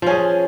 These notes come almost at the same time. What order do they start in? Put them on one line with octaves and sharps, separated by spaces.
F3 C#4 G#4